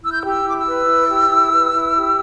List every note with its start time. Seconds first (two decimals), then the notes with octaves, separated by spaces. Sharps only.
0.02 E4 E6
0.10 G6
0.19 E6
0.23 G4
0.30 E6
0.45 E4
0.50 D6
0.58 E6
0.66 B4
0.87 E4
1.09 G4
1.30 E4
1.51 B4
1.74 E4
1.94 G4